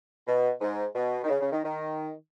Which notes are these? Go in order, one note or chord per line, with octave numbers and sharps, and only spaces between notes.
B2
G#2
B2
D#3
C#3
C#3
D#3
D#3